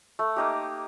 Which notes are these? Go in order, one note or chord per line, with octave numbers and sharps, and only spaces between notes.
A3
A#3 D#4 G4